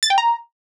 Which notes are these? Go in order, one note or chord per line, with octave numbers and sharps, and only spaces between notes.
A6
G5
A#5